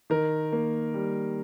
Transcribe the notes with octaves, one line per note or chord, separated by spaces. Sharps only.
D#3 A#4
A#3
G3